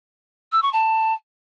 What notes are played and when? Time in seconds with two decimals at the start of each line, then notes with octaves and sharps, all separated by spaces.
0.52 E6
0.62 C#6
0.73 A5